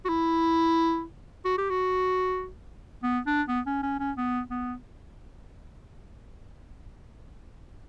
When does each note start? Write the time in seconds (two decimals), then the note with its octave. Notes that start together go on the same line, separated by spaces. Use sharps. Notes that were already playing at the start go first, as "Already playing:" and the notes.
0.05 F#4
0.09 E4
1.45 F#4
1.58 G4
1.70 F#4
3.03 B3
3.26 D4
3.48 B3
3.66 C#4
3.83 C#4
4.00 C#4
4.17 B3
4.50 B3